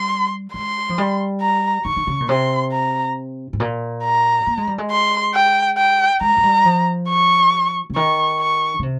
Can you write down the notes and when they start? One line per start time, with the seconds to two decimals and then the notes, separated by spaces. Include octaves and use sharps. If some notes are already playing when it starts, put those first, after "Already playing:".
Already playing: G3 C6
0.54 G#3 C6
0.89 F3
0.98 G3
1.41 A#5
1.85 D#3 C#6
1.97 D#3
2.07 C#3
2.20 A#2
2.29 C3 C6
2.73 A#5
3.53 G#2
3.60 A#2
4.04 A#5
4.47 A#3
4.57 G#3
4.67 G3
4.78 G#3
4.91 C6
5.34 G5
5.77 G5
6.21 G#3 A#5
6.37 G#3
6.43 G3
6.65 F3
7.09 C#6
7.90 C#3
7.96 D#3 C#6
8.39 C#6
8.79 C#3
8.83 C3